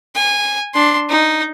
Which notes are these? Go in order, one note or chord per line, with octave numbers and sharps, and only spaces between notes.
G#5
D4 C6
D#4